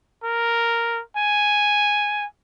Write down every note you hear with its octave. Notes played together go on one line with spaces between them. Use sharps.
A#4
G#5